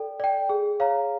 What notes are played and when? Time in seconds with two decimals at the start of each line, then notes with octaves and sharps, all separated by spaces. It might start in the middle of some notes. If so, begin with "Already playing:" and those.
Already playing: A4 D5 G5
0.20 D5 G5
0.49 G#4
0.80 C#5 F5 A#5